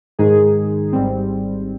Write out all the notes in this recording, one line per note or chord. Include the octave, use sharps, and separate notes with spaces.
G#2 D#3 G#3 D#4 G#4
G#1 G#2 G3 C4